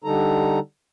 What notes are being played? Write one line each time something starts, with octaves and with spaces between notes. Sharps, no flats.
D3 G3 D#4 A4 A#5